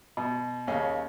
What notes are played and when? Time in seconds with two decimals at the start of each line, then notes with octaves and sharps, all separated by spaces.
0.17 B2
0.67 D#2 C#3 C#4